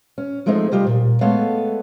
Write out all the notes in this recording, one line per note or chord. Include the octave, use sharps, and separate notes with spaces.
C#4
F3 G#3 A3 C4 D#4
C3 G3 F4 G4 D#5
A#2
G#3 A3 B3 A4 C#5 F5